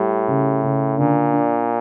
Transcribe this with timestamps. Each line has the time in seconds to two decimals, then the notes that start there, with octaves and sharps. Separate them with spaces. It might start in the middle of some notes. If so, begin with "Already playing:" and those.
Already playing: A2 G3
0.28 C#3
0.63 C#3
0.98 A#2 D3
1.33 D4